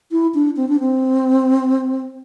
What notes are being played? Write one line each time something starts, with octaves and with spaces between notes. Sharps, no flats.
E4
D4
C4
D4
C4